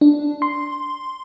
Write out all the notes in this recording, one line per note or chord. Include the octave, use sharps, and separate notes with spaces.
D4
C6